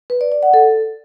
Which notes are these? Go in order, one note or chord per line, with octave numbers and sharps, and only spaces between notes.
B4
D5
D5
F#5
A4